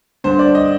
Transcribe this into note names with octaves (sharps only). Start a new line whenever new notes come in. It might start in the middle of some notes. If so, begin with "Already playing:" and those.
G2 D3 C5
D5
D#5